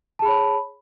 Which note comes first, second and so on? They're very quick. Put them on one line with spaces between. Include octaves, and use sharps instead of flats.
A5 G#4 B5 C#5